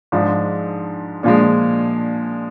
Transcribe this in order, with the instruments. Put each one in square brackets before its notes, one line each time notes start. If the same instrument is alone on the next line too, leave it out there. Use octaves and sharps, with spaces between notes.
[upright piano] G#2 F3 G#3 D4
A#2 F3 G#3 D4